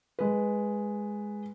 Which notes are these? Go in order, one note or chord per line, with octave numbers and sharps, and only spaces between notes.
G#3 B4